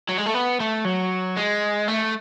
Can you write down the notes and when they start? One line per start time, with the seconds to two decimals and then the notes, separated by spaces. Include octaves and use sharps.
0.09 F#3
0.18 G#3
0.26 A3
0.34 B3
0.60 A3
0.85 F#3
1.36 G#3
1.88 A3